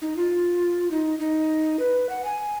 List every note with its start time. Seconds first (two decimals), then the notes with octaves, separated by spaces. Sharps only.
0.02 D#4
0.16 F4
0.91 D#4
1.19 D#4
1.79 B4
2.09 F#5
2.24 G#5